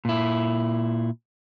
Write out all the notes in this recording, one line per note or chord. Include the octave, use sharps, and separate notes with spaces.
A#2 E4